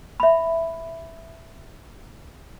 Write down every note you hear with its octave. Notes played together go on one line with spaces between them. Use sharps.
E5 B5